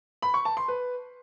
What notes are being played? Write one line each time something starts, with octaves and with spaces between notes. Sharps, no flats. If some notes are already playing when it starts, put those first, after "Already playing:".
B5
C#6
A5
C6
B4